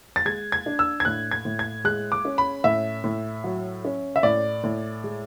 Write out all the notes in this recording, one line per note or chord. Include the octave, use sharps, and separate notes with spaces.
A6
G#3 G#6
G#6
D4
E6
G#6
A2 F#6
G#6
A2
G#6
G#3 F#6
D6
C#4
B5
A2 E5
A2
F#3
C#4
E5
A2 D5
A2
G#3